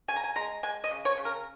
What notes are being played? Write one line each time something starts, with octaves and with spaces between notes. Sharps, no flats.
C#3 G#5
A#5
G#5
G#3 A#5
G#3 G#5
D#5
C#3
C#5
C#3
A#4